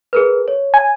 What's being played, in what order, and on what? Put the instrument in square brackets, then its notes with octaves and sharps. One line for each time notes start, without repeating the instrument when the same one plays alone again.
[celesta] G#4 A#4 B4
C#5
[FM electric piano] G#5